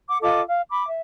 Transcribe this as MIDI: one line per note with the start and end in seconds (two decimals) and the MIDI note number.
0.08 0.18 78
0.08 0.18 86
0.21 0.41 65
0.21 0.41 69
0.21 0.41 75
0.21 0.41 86
0.46 0.61 77
0.70 0.86 83
0.70 0.86 86
0.86 1.01 76